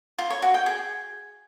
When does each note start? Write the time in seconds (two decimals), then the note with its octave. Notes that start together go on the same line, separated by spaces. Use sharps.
0.19 F4
0.30 C#5
0.42 F#4
0.54 G5
0.66 G#4